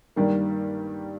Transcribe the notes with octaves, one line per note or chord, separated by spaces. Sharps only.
G2 D#3 G3 A#3